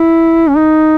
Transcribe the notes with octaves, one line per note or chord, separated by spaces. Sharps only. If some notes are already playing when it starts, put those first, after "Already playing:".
Already playing: E4
C#4
D#4